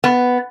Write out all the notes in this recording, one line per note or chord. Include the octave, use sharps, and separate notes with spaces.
B3